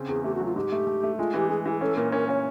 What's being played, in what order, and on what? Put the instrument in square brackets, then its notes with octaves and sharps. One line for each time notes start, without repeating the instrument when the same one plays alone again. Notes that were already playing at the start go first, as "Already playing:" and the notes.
Already playing: [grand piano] C#3 C4
[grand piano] E2 [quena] G#4
[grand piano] A3 [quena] G4
[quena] F#4
[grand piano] F#3
[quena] F4
[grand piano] G#2 [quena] G4
[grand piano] A3
A3
A3
[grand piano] G#3 [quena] F4
[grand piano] E3 [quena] G4
[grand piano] G#3 [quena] G#4
[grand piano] E3 [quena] G4
[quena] G#4
[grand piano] C#4 [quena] A4
[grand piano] A#2 [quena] A#4
[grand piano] C#4 [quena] A#4
[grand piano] C#4 [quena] C#5